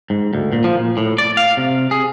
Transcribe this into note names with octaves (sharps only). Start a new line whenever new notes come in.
G#2
D2
A#2
F3
A#2
A2
D5
F5
C3
G#4